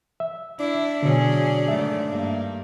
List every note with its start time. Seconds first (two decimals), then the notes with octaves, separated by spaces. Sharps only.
0.20 E5
0.60 D4 E4
1.03 B2 D3 F#3 C#4 G#4
1.68 G#2 D#3 A3 E5
2.09 G2 A#3